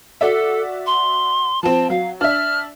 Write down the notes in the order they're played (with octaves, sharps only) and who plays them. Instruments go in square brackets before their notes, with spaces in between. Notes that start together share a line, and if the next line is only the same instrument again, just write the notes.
[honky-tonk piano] F#4 D5 E5 [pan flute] A4
[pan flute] C6
[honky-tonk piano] F3 C4 [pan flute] A5
[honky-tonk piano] F#3 [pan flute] F5
[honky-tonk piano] D4 E5 [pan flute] F6